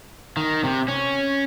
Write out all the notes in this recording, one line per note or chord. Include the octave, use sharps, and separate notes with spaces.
D#3
C3
C#4